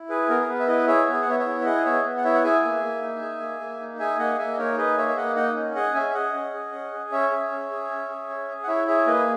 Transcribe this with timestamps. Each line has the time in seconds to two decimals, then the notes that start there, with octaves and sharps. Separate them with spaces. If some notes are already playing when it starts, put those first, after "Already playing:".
Already playing: E4
0.09 G#4 B4
0.29 B3 A#4
0.41 A#4
0.48 B3 B4
0.59 E5
0.67 E4 B4 D#5
0.87 G#4 C#5 E5
1.07 B3
1.13 E5
1.22 F#5
1.27 B3 C#5 E5
1.39 C#5 E5
1.46 E4
1.61 E5
1.65 G#4 D#5 F#5
1.85 B3 C#5 E5
2.04 B3
2.17 F#5
2.24 E4 C#5 E5
2.34 F#5
2.43 G#4 E5 G#5
2.63 A#3
2.83 A#3
3.02 D#4
3.22 G#4
3.41 A#3
3.60 A#3
3.80 D#4
3.99 G#4 E5 G#5
4.19 A#3 D#5 F#5
4.39 A#3 E5 G#5
4.53 D#5
4.58 D#4 A#4 C#5
4.77 G#4 B4 D#5
4.97 A#3 C#5 E5
5.08 E5
5.17 A#3 D#5 F#5
5.36 D#4 D#5 F#5
5.56 C#4
5.75 G#4 D#5 F#5
5.94 C#4 E5 G#5
6.09 E5
6.14 G#4 D#5 F#5
6.34 C#4
6.54 G#4
6.73 C#4
6.92 G#4
7.12 C#4 C#5 E5
7.31 G#4
7.51 C#4
7.70 G#4
7.90 C#4
8.09 G#4
8.29 C#4
8.49 G#4
8.63 F#5
8.68 E4 C#5 E5
8.87 G#4 C#5 E5
9.07 A#3 B4 D#5